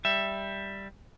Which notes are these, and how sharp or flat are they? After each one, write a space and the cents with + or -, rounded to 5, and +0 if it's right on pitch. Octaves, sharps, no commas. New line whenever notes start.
G3 +5 E5 +10